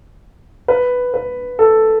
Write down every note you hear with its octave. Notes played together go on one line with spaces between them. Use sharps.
B4
B4
A4